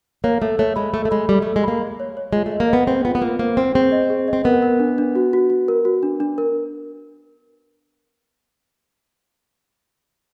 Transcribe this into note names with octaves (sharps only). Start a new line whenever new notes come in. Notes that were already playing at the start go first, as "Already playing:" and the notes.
A#3 C#5
A3 A4
A3 C#5
G#3 B5
A3 A4
A3
G#3 B5
G3 A4
A3 A4
G#3
A#3 B5
B5
C#5
C#5
G#3 F4
A3
D#5
A#3
B3 D#5
C4 G#4
B3 F4
B3
A#3 F4
A#3 C5
C4 C5
C4 G#4
D#5
G#4
D#5
C4
B3 A#4
A#4
D4
D4
F#4
F#4
F#4
A#4
F#4
D4
D4
A#4